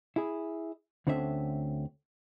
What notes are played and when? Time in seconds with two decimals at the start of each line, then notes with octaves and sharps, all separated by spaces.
0.16 E4 G#4
1.07 D2 D3 C4 C#4 F4 E5